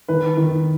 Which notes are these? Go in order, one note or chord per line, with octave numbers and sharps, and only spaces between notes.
D#3 B4
D#3